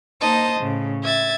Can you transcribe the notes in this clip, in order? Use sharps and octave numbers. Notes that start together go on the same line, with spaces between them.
A#3 D#4 C5 D#5 A5
A2 C#3
E5 G#6 A6